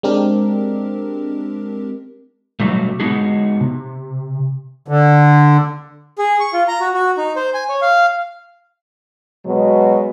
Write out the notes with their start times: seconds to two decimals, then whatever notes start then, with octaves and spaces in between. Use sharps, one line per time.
0.03 G#3 C4 D4 G4 A#4
2.60 B2 F#3 G3 A3
3.00 G#3 B3 D#4 F#4 G#4
3.61 C3
4.88 D3
6.18 G#4
6.40 C#6
6.53 F4
6.68 A#5
6.80 F#4
6.94 F#4
7.18 D#4
7.36 C5
7.54 G#5
7.69 C#5
7.82 F5
9.44 B2 F#3 G#3